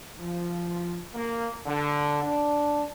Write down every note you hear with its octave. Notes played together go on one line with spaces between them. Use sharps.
F3
A#3
D3
D4